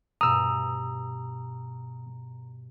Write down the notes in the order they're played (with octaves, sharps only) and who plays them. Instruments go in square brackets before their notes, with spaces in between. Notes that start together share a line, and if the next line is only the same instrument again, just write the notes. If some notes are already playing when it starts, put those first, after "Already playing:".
[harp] G2 B2 G#5 [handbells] A#5 [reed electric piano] D#6 E6